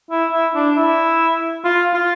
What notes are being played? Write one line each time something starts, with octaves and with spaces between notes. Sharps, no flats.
E4
E4
D4
E4
F4
F4